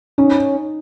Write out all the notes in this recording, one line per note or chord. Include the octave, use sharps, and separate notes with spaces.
C#4 D#4